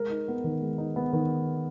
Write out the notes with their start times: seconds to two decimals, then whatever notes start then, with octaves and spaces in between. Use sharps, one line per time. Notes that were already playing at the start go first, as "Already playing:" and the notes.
Already playing: G#3 A#4
0.10 D#4
0.28 B3
0.44 D#3
0.62 G#3
0.78 D#4
0.96 B3
1.13 D#3